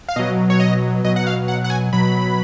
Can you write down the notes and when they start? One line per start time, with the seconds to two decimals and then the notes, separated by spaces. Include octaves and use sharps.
0.09 F5
0.16 B2 F#3 D#5
0.50 C#5
0.60 D#5
1.05 B2 F#3 D#5
1.16 F#5
1.27 F5
1.48 F#5
1.64 F#5
1.70 G#5
1.93 B2 F#3 B5